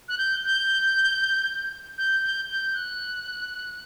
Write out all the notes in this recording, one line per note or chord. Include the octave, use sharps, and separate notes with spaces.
F#6
G6
G6
G6
G6
G6
F#6